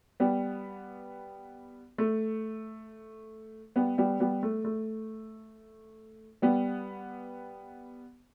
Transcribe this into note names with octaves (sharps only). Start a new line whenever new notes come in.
G3 B3
A3
G3 B3
G3 B3
G3 B3
A3
A3
G3 B3